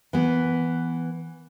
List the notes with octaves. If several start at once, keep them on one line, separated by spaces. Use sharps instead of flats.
E3 B3